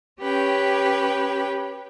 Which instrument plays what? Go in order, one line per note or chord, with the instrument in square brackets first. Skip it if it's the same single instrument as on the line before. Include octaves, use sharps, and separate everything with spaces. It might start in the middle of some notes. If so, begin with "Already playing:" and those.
[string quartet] C#4 G4 B4 C#5 G5